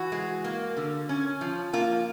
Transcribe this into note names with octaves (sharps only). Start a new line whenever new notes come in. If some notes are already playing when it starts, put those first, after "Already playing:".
Already playing: E3 F#4
G#3
A#3
D3
C#4
F3
A#3 F4